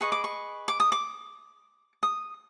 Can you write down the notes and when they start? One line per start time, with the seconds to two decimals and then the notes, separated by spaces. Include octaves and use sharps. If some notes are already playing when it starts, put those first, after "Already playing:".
0.01 G#4 B4 D#5 C#6
0.12 D6
0.24 C#6
0.68 D6
0.80 D#6
0.92 D6
2.03 D#6